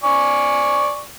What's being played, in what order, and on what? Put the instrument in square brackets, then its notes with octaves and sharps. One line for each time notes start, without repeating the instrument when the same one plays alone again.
[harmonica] D5 G#5 C#6